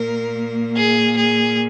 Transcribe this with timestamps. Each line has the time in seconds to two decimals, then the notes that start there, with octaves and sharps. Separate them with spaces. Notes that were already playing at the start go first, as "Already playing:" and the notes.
Already playing: A#2 A#3 A#4
0.76 G#4
1.16 G#4